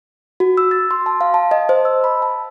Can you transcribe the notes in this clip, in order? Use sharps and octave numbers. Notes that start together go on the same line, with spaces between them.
F#4
E6
A6
C6
A5
F5
A5
D#5
C5
E6
B5
A5